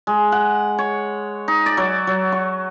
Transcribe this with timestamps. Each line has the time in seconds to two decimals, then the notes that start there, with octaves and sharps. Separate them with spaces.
0.07 G#3
0.32 F#5
0.78 C#5
1.48 D#4
1.66 D5
1.77 F#3
2.07 F#3
2.32 C#6